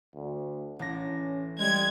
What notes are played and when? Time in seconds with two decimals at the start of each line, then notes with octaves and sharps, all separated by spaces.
0.16 D2
0.79 A1 C#4 D4 A#6
1.60 G3 G#3 G#6